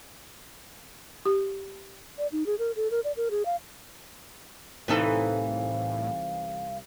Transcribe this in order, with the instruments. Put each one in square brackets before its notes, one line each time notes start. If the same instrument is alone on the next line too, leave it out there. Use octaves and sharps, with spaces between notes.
[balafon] G4
[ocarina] D5
D#4
G#4
A#4
A4
A#4
D5
A#4
G#4
F5
[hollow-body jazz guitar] C2 D#4 [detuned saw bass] A2 [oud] E3 C4 A4 [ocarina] F5